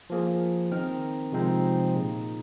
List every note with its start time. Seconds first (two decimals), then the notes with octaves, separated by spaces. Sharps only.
0.10 F3 A#3 G#4
0.71 D#3 C4 D#4 A#4
1.32 C3 F3 G#3 C4 D#4
1.95 A#2 A#3 D#4 G#4